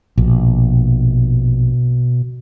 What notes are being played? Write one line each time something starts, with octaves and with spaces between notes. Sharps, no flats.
A#1 B2